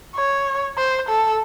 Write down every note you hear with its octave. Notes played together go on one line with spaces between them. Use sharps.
C#5
C5
A4